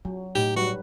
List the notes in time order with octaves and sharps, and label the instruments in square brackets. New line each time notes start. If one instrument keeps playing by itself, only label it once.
[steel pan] F#3 [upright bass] F4
[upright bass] A2 [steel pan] D#4 [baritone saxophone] G4
[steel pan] F#3 G3 B4 [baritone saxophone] F#4